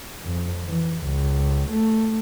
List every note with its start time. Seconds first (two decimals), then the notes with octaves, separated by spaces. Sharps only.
0.25 F2
0.67 E3
1.05 C#2
1.71 A3